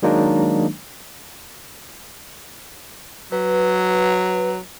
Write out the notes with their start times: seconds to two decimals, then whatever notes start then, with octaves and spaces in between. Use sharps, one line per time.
0.02 D#3 F#3 G#3 A#3 D4 D#4
3.32 F#3 B4